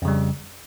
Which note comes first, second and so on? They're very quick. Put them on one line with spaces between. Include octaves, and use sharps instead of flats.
F2 C#3 G3